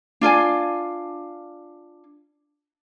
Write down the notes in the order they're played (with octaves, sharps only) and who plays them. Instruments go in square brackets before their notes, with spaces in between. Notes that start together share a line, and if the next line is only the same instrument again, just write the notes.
[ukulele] D4 F4 D5 G#5